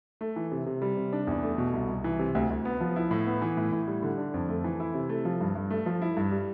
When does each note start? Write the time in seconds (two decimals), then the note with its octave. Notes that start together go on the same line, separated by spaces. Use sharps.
0.21 A3
0.36 E3
0.52 C3
0.66 C3
0.82 G3
0.97 C3
1.13 D4
1.27 E2
1.43 A3
1.58 B2
1.73 C2
1.89 C2
2.04 E3
2.19 C3
2.35 D2
2.50 D2
2.65 B3
2.81 F3
2.96 E4
3.11 A2
3.26 B3
3.42 E3
3.57 A2
3.72 A2
3.88 G3
4.03 D3
4.18 D4
4.34 F2
4.49 A3
4.64 E3
4.80 E4
4.94 C3
5.09 A3
5.25 F3
5.41 G2
5.55 G2
5.70 A3
5.86 F3
6.02 E4
6.17 G2
6.32 G3